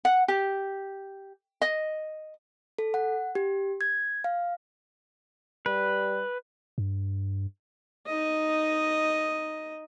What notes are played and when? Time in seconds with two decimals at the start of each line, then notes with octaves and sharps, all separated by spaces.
0.05 F#5
0.28 G4
1.61 D#5
2.78 A4
2.94 F#5
3.35 G4
3.81 G#6
4.24 F5
5.66 G3 B4
6.78 G2
8.06 D#4 D#5